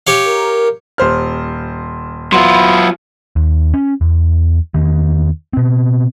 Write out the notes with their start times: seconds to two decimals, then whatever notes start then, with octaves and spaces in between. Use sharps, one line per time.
0.07 G4 C#5 F5
0.25 A#4
0.98 D#1 C5 F6
2.32 F#3 B3 E4 F4 C6
3.36 D#2
3.74 C#4
4.01 E2
4.74 E2 D#3
5.53 B2 C4